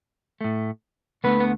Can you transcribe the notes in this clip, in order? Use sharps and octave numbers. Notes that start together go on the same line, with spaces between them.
A2 A3
D2 D3 A3 B3 B4
B3